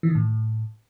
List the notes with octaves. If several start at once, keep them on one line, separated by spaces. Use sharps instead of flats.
E3
D#3
A2